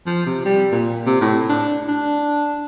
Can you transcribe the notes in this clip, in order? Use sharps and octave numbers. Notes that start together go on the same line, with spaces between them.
F3
C3
G3
A#2
C3
A2
D4
D4